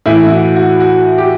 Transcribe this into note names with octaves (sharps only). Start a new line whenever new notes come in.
A2 E3 E4
E4
F#4
F#4
F#4
G4